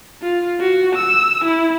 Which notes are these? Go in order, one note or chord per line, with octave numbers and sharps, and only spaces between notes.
F4
F#4
E6
E4